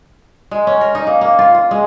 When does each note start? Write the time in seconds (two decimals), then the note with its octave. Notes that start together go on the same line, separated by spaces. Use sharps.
0.51 G#3
0.67 C#4
0.81 A#4
0.95 D#4
1.07 A#3
1.21 A#3
1.39 F4
1.55 F4
1.71 G#3